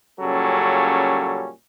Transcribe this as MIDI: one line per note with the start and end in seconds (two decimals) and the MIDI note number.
0.20 1.49 46
0.20 1.49 49
0.20 1.49 54
0.20 1.49 55
0.20 1.49 61
0.20 1.49 69